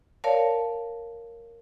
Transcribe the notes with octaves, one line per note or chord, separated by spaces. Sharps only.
A#4 C#5 D5 F5 A5